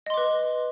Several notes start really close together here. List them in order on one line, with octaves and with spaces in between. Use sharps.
D#5 C6 D6 B4